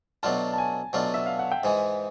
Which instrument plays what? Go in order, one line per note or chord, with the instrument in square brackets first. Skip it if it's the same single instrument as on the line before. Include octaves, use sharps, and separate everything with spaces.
[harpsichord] B2 F#3 A3 D4 F4 [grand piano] A5
[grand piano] A5
G#5
[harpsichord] B2 F#3 A3 D4 F4
[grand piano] E5
F5
F#5
G5
[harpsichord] G#2 E3 G#3 [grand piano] G#5